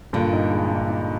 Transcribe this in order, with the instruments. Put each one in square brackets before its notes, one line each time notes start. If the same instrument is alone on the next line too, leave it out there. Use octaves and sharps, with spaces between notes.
[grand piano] G2 [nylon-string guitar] A#2 D3
[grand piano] D#4
G#3
D#4
D#4